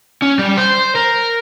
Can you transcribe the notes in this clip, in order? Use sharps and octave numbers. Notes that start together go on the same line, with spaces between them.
C#4
G3
C5
A#4